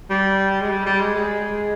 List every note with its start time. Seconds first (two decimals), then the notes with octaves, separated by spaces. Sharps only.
0.10 G3
0.61 G#3
0.70 G3
0.86 G3
1.00 G#3
1.15 G#3